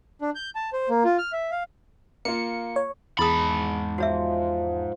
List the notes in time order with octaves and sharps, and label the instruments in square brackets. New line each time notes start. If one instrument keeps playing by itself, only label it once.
[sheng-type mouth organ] D4
G6
A5
C5
A#3
F4
F6
E5
F5
[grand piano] A#3 F4 [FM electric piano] C#7
[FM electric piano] C#5
[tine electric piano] E2 A5 [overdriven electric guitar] G#2 B5 [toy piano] E4 G#4 D#6
[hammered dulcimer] F3 [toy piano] F#4 C#5 E5